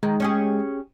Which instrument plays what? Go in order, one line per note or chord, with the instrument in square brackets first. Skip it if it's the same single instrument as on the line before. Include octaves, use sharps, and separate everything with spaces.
[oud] D#3 [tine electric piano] G#3
[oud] C#4 G4 G#4